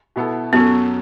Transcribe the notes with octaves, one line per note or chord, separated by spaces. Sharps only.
B2 B3 E4 A4
F#2 F#3 B3 C#4 A4